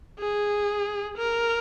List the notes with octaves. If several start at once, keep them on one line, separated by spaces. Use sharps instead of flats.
G#4
A#4